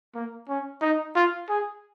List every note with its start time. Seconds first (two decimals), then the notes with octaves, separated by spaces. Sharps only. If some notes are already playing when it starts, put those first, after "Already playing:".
0.15 A#3
0.48 C#4
0.81 D#4
1.16 F4
1.49 G#4